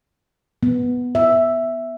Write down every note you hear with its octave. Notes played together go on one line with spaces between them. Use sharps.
B3
E5